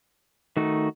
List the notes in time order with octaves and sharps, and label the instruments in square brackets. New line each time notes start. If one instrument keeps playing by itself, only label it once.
[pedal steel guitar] D#3 A3 D#4 F#4